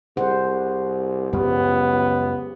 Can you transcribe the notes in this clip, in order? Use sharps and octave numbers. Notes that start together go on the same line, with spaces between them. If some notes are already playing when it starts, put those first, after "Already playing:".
C2 G#4 C5 F#5
C#2 F#2 F3 F#3 B3 G4